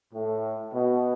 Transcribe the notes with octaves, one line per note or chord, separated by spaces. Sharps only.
A2
B2